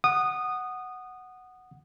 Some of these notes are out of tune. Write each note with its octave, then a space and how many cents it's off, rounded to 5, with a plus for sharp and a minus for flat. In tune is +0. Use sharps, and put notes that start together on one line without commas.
F#5 +0 D#6 -15